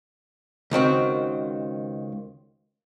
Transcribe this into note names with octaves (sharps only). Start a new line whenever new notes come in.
C#2 D#3 C4 F#4